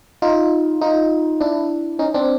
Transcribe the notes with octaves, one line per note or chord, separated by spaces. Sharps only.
D#4 F4
D#4 F4
D4 E4
C#4 D#4
C4 D4